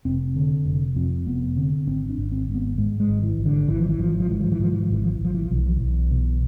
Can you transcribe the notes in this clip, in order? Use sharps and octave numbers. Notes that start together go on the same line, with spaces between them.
F1 C4
D3
F1
F2 C4
F1 B3
D3 C4
G#1 C4
D4
G#1
C4
G#2
B3
G#2 G#3
G#3
G#1
E3
G#1
D3
G#1 E3
F3
E3
G#1 F3
E3
F3
G#2 E3
F3
E3
G#2 F3
E3
F3
G#1 E3
F3
E3
G#1
F3
E3
F3
B1 E3
F3
B1 E3
B2